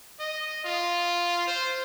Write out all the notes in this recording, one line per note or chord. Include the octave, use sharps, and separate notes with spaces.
D#5
F4
C5